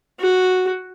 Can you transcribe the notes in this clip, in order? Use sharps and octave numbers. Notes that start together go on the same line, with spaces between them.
F#4